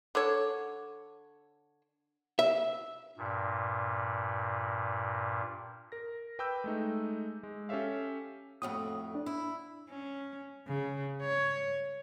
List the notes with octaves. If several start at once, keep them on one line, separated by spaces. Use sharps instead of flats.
D3 A4 C#5
E5
G2 A#2
A#4 A#6
B4 G5 B5 D6 E6 G6
G#3 A3 D#4
G#3
C#4 G4 A4 C#5 E5 F5
F2 A2 F#4 D#6
D4
E4
C#4
C#3
C#5